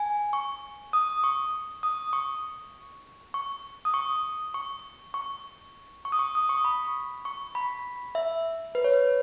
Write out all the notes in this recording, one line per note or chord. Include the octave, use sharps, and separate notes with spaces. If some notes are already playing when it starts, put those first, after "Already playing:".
Already playing: G#5
C#6
D#6
C#6
D#6
C#6
C#6
D#6
C#6
C#6
C#6
C#6
D#6
C#6
D#6
C#6
B5
C#6
B5
E5
B4
C#5
B4